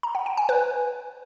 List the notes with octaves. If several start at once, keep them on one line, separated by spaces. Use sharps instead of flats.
A#5
F#5
G5
G#5
B4